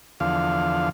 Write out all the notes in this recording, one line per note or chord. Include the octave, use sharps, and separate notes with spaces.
E2 D3 F3 F5